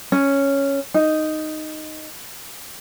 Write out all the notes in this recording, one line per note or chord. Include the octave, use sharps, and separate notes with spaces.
C#4
D#4